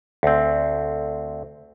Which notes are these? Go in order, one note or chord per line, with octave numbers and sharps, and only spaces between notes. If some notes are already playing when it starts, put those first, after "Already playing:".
D2 C4